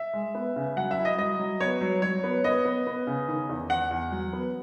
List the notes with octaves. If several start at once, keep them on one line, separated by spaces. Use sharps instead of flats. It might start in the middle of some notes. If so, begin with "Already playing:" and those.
Already playing: E5
G#3
B3
C#3
F#3 F#5
E5
E4
D#5
F#3 D#5
F#3
B3 C#5
F#3
F#3 C#5
B3
B3 D#5
B3
B3
C#3
D#3
E2
E2 F#5
E2
F#3
B3